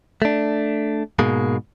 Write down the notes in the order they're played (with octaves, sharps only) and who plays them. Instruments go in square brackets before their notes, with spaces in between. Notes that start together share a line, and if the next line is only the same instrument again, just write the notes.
[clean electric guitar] A3 D4
G#2 B2 G#3 A#3